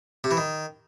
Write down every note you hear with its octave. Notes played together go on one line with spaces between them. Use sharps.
C3
E3
D#3